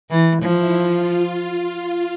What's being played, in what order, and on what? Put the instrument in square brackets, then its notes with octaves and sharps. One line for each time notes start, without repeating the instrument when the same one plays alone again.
[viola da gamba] E3
[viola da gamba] F3 [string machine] E4
[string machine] F4